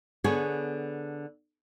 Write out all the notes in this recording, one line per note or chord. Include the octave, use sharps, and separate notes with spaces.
D3 B3 G#4 C#5